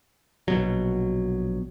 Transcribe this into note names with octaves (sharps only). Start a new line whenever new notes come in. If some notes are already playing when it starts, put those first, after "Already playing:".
A#1 B2 F#3